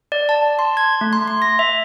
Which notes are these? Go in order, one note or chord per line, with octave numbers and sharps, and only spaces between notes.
D5
A5
C6
G#6
A3
C6
C6
A#6
E5